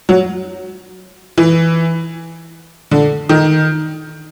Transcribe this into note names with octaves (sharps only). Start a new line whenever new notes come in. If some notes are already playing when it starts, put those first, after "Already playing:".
F#3
E3
D3
D#3